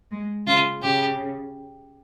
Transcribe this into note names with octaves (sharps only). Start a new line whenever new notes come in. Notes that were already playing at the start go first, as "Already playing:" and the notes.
G#3
C#3 F4
C#3 G4